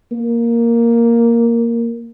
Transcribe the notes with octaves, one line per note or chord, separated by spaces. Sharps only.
A#3